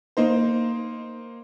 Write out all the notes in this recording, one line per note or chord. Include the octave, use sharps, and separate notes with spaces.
A#3 D#4 C5